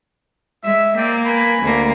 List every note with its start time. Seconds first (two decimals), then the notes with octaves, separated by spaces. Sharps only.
0.64 G#3 E5
0.96 A#3 C4 D5 G5
1.25 B4 G#5 B5
1.62 D2 A#3